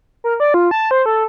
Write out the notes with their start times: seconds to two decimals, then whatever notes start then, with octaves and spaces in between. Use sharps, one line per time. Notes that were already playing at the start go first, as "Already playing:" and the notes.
0.24 A#4
0.40 D5
0.54 F4
0.71 A5
0.91 C5
1.06 A4